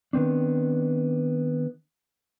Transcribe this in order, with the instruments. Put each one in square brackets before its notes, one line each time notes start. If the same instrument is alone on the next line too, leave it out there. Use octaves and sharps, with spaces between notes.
[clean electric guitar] D#3 B3 C4 D4